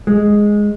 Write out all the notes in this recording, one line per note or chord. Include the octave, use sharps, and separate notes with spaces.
G#3